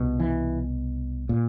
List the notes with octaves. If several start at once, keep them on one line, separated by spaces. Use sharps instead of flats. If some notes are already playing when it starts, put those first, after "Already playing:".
Already playing: C2 B2
E3
A#2